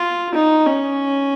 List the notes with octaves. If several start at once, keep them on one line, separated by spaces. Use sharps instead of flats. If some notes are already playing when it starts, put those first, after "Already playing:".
Already playing: F4
D#4
C#4